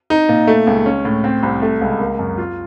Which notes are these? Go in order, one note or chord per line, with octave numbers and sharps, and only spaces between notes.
D#4
A#2
A3
C#2
C#4
A2
C4
C2
A3
C#2
A#3
F#2
F4